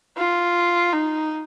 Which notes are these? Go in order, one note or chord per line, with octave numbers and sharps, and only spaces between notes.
F4
D#4